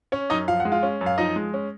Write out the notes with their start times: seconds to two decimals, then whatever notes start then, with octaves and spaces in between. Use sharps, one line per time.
0.12 C#4 C#5
0.30 F#2 D#4 D#5
0.48 F3 F5
0.60 F#5
0.65 G#3
0.72 F4 F5
0.83 C#4
1.01 F#2
1.06 F5
1.18 F3 D#4 D#5
1.36 G#3
1.54 C#4